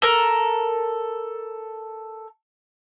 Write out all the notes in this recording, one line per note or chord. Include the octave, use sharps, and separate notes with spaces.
A4 A#4